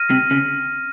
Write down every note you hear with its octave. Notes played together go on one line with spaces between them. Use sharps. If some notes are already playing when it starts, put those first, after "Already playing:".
Already playing: F6 A#6 D#7
C3
C#3